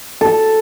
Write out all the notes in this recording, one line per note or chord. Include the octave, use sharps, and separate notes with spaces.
A4